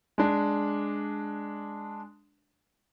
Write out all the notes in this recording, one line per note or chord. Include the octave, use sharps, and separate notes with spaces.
G#3 D4